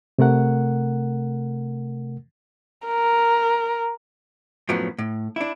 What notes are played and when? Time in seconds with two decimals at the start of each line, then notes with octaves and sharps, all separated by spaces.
0.19 C3 A3 A#4 F#5
2.87 A#4
4.69 F#2 A2 F3 F#3 B3
4.98 A2
5.36 D4 E4